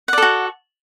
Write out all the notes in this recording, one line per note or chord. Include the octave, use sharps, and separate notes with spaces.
F#4 A4 D5 F#5